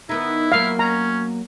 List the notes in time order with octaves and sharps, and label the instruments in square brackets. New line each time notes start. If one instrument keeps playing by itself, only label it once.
[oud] D#3 B3 D#4 [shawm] E4
[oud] F#3 A#3 B3 [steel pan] F5
[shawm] C#4 [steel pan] A#5